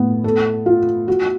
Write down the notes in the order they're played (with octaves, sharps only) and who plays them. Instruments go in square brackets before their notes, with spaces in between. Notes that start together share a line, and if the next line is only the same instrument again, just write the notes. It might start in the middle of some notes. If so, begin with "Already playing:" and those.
Already playing: [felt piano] A2 B3
A4
F4
F#4